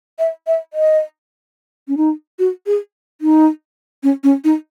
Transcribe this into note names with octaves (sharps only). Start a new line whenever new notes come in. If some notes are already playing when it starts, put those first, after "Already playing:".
E5
E5
D#5
C#4
D#4
F#4
G#4
D#4
C#4
C#4
D#4